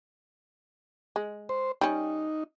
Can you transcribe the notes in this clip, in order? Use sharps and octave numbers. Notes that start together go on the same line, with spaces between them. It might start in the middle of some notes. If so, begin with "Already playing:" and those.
G#3
C5
G3 C#4 D#4